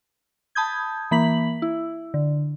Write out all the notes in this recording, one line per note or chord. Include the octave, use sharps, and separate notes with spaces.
A5 B5 D#6 G6 G#6
E3 A#3 B5 B6 F#7
E4
D3